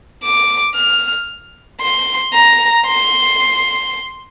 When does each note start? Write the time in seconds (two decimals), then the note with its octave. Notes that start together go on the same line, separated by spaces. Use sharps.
0.24 D6
0.75 F6
1.82 C6
2.33 A#5
2.87 C6